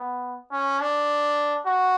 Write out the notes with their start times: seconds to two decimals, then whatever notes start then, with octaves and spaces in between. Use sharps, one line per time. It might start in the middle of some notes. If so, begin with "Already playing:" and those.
Already playing: B3
0.51 C#4
0.80 D4
1.65 F#4